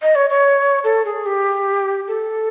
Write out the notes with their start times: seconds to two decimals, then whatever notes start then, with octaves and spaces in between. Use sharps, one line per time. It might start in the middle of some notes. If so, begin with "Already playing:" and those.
0.02 D#5
0.15 C#5
0.30 C#5
0.84 A4
1.05 G#4
1.26 G4
2.08 A4